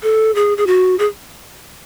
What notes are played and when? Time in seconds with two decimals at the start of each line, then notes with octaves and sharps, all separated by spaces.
0.03 A4
0.35 G#4
0.57 G#4
0.67 F#4
0.99 G#4